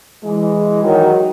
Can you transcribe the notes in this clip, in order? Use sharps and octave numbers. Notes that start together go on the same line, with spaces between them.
E3 G#3
D#3 F#3